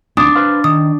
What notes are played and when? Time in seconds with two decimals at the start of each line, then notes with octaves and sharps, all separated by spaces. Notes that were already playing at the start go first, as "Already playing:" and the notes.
0.17 D2 C4 D4 D#6
0.35 B4 C5 F5
0.64 D#3 D#6